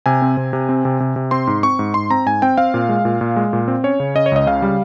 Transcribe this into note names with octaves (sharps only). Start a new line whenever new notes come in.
C3 G#5
C4
C3
C3
C4
C3
C3
C3
C4 C6
G#2
C4 C#6
G#2
G#2 C6
C4 A#5
G#2 G#5
C4 G5
C4 F5
A#2
G#3
A#2
A#2
G#3
A#2
C4
C#4 C#5
C#3
C#4 D#5
C#5
C#2 D#5
C#3 F5
G3